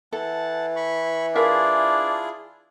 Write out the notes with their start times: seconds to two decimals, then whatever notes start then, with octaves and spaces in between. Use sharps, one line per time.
0.13 E3 A4 F#5 A5
0.76 B5 C#6
1.35 D4 E4 F4 G#4 A#4 E5 F5